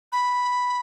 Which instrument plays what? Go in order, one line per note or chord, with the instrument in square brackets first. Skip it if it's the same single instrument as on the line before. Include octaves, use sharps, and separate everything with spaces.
[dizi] B5